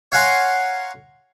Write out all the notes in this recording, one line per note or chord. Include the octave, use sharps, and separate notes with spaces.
C#5 F5 F#5 G#5 A#5 C6